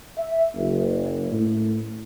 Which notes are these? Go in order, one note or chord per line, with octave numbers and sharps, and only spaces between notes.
E5
F#1
A2